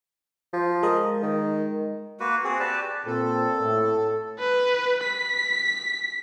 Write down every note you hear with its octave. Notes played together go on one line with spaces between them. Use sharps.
F3
G#3 A#4 D#5
D#3
A#3 F#4 B4
C4 F#4 G#4
G4 B4 D5 A5
A#2 C4 A4
A2
B4
B6